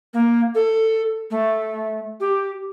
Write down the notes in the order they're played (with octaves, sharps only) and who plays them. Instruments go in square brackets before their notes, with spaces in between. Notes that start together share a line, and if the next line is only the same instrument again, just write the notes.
[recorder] A#3
A4
A3
G4